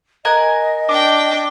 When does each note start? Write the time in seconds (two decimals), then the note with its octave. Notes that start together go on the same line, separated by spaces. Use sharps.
0.25 A#4 D#5 G#5 F#6
0.89 D4 G5 D6